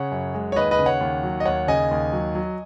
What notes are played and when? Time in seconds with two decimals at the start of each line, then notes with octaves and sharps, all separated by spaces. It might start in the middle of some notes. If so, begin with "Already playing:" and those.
Already playing: C#3 C#5 F#5
0.12 F#2
0.34 G#3
0.52 C#5
0.56 D#2 B4 D#5
0.71 B4 D#5
0.79 C#3
0.86 C#5 F#5
1.01 D#2
1.23 F#3
1.40 D#5
1.45 D#2 C#5 F#5
1.68 C#3 D#5 G#5
1.91 D#2
2.13 F#3
2.35 F#3